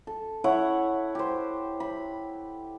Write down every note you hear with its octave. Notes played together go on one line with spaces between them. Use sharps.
A4
E4 C#5 F#5
G4 C5
B5